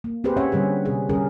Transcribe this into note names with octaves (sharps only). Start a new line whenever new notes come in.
A#3
C4 G4 G#4 B4 C5
C#4 C#5 E5 F#5
D3 G3 C#4 G#4
C3 G#4
D3 G3 C#4 G#4 A#4